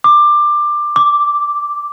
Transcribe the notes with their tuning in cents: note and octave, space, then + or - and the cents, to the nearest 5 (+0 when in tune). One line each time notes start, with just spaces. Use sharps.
D6 +15
D6 -5